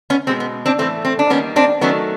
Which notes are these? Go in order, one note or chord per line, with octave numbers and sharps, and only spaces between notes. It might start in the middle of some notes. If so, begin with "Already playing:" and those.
B3 C#4
B2 G#3 B3 C4
B3
C4 D4
A2 E3 A3 C4
C4
D4
D#3 G3 A#3 B3 C#4
C4 D4
D#3 F#3 A3 B3 C#4